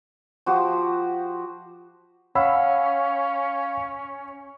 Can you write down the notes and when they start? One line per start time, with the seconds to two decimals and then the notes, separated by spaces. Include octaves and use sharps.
0.46 F3 F#4 G4 C5
2.35 C#4 C#5 F5 F#5 B5 E6